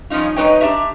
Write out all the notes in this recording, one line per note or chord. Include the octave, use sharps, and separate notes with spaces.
G2 F3 C#4 D#4 F4
G#3 D#4 B4 C#5 D#5 G5
D4 G4 E5 A#5